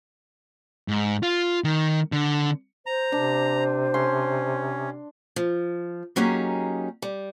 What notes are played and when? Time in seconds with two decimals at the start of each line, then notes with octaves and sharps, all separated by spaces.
0.88 G#2
1.23 F4
1.64 D#3
2.12 D3
2.86 C5 A#5
3.12 C3 D4
3.94 C#4 C6
5.36 F3
6.16 F#3 A#3 C#4 D#4 G4 G#4
7.02 G3